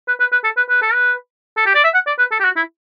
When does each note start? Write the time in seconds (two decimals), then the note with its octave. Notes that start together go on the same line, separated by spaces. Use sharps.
0.08 B4
0.20 B4
0.32 B4
0.44 A4
0.57 B4
0.69 B4
0.82 A4
0.94 B4
1.57 A4
1.66 G4
1.75 D5
1.84 E5
1.94 F#5
2.07 D5
2.19 B4
2.32 A4
2.40 G4
2.45 F#4
2.57 E4